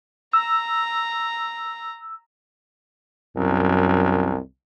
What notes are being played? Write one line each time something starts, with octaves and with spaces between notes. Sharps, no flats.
A#5 E6
C2 F#2